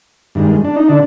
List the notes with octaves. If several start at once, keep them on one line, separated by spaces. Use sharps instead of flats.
G2 D#3 G#3
D4
D#4
D3 D4